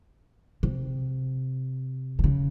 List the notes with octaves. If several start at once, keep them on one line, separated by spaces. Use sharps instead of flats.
C3
D#3
C#3